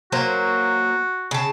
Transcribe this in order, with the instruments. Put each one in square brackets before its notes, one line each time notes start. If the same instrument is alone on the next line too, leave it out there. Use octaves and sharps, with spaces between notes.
[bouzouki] F#3 A#3 C5 [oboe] F#4
[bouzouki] C#3 A5